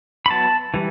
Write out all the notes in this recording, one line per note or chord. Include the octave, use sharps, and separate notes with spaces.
B5
F#3 B3 E4 A5
E3 G3